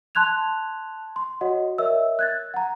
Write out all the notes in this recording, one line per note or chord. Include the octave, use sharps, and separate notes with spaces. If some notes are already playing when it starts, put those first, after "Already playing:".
A5 C6 F#6 G#6 F7
C6
F#4 C#5 D#5 F#5
A#4 C#5 D#5 E5 E6
F#6 G#6 A6
F#5 A#5